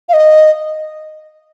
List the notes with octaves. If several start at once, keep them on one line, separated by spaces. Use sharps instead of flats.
F5
D#5